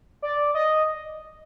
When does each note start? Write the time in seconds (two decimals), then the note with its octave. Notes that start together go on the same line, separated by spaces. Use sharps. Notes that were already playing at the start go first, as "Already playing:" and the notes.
0.22 D5
0.55 D#5